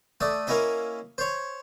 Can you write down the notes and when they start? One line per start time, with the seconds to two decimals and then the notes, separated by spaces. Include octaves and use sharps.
0.21 A3 D5 E5 D#6
0.47 A#3 C#4 E4 D#5 E5
1.18 C5 C#5